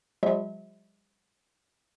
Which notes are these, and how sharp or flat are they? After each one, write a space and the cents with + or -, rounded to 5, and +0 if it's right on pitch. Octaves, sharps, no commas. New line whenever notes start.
F3 +45 G#3 -45 E5 -30